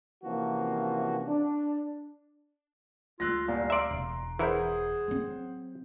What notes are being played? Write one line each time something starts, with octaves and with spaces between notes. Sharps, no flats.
C3 E3 F3 A#3 C#4 F#4
D4
D2 G#3 F4 E6 F#6 A#6
C2 A#2 F5
D5 E5 A#5 C6 D7
E1
E3 E4 G#4 A#4 C5 F#5
F#3 C4